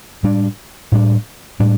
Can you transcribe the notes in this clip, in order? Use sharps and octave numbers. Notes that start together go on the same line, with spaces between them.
A2 G3 D4
A2 G3 D4
A2 G3 D4